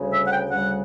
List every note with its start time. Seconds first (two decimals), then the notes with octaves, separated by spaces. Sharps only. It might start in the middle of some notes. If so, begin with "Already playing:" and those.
Already playing: D2 C#3 G3
0.12 E5
0.26 F#5
0.31 G5
0.50 D2 C#3 G3 F#5